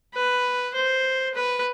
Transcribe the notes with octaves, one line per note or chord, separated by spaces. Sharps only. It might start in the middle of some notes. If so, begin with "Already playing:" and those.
B4
C5
B4